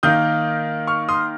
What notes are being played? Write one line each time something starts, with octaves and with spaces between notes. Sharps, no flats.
D#3 A#3 D#4 D#6 G6
C#6 F6
C6 D#6